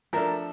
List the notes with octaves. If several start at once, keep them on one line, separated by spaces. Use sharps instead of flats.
F3 A3 D4 A4 A#4